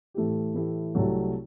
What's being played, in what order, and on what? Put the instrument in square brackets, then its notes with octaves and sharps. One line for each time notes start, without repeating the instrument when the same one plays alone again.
[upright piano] A2 E3 A3 E4 G4
A2 E3 A3 E4 G4
C2 C3 F#3 A3